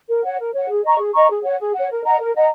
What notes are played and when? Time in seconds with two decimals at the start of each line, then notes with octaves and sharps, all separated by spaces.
0.08 A#4
0.24 C#5 F#5
0.39 A#4
0.53 C#5 F#5
0.69 G#4
0.84 D#5 A#5 C#6
0.98 G#4
1.15 D#5 A#5 C#6
1.29 G#4
1.43 C#5 F#5
1.59 G#4
1.74 C#5 F#5
1.90 A#4
2.05 D#5 F#5 A#5
2.19 A#4
2.35 D#5 F#5 A#5